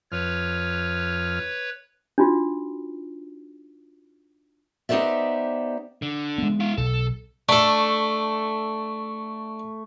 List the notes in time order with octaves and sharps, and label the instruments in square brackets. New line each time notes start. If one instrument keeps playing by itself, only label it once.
[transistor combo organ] F2 F6 [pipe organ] B4 C#5
[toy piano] D4 D#4 F4 F#4
[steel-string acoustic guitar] B3 D#4 G4 C5 D5 E5
[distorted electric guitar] D3
[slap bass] G#3 B3
[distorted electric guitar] E4 F5
[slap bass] B1 [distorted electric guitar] A4
[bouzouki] A3 [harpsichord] D4 A4 [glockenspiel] C#6